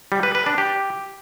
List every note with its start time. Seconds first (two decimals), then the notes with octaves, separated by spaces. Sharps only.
0.12 G3
0.23 B4
0.35 B4
0.46 D4
0.58 G4